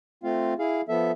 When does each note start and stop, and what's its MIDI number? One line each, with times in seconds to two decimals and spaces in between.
0.24 0.54 57
0.24 0.54 60
0.24 0.54 65
0.24 0.54 77
0.59 0.81 64
0.59 0.81 68
0.59 0.81 77
0.89 1.12 53
0.89 1.12 59
0.89 1.12 69
0.89 1.12 76